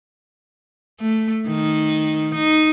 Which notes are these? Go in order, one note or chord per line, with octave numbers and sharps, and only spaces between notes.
A3
D#3
D#4